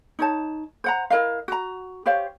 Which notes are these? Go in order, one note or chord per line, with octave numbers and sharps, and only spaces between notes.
D#4 C#5 A5
C5 F#5 A#5
E4 A#4 D#5 F5
F#4 A#5
G4 C5 C#5 F5